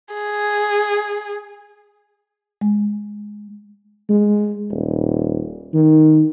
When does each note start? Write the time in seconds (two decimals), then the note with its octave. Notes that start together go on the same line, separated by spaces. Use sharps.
0.15 G#4
2.61 G#3
4.09 G#3
4.70 D#1
5.74 D#3